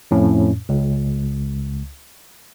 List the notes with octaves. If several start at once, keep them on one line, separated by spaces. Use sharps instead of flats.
F2 A2 C#4
C#2